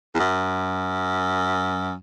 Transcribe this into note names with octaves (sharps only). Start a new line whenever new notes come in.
E2
F#2